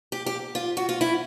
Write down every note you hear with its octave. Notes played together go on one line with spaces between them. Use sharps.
G4
G4
F4
F#4
F4
E4